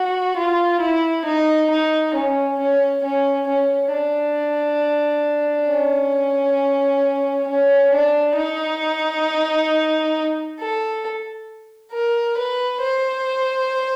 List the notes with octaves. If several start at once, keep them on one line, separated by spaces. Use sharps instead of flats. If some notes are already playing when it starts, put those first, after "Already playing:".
Already playing: F#4
F4
E4
D#4
D#4
C#4
C#4
C#4
C#4
D4
C#4
C#4
D4
D#4
A4
A#4
B4
C5